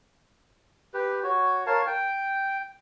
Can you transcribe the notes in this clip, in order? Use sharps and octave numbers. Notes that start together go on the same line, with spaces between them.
G4 B4
F#4 C#5
A#4 C#5 F5 A5
G5